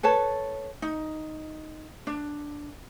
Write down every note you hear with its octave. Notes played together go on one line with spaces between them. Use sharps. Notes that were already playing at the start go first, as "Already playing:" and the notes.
A4 B4 C#5 A5
D#4
D4